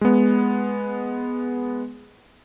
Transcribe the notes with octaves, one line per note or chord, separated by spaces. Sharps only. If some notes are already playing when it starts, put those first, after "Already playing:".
G#3 B3